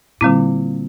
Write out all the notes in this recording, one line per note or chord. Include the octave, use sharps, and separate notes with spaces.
A#2 D3 G3 C4 E4